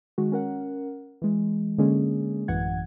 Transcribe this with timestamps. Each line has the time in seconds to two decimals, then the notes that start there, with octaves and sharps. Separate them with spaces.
0.18 D#3 G#3 F#4
0.32 C#4 A#4 F#5
1.22 E3 G#3
1.78 D3 G#3 A#3 C#4 G#4
2.48 A1 F#2 E3 F#5 G#6